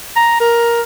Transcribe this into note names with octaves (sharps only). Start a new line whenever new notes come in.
A#5
A#4